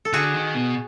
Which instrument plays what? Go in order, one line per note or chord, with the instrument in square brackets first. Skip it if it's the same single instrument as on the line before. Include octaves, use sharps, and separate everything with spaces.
[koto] A4
[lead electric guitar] D3 [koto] F#4 G#4
[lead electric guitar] D#3
B2